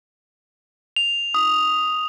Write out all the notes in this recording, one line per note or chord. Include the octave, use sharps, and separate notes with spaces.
F7
D#6